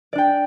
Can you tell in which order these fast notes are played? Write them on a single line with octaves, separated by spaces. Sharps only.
D5 D4 G5